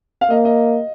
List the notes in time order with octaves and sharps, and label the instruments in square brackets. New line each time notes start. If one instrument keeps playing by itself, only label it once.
[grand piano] F5
[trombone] A#3 [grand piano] D#5
[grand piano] D#5